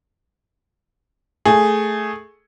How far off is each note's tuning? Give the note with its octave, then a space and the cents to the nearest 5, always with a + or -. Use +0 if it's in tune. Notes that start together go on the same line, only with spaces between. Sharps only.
A3 +0 G#4 +0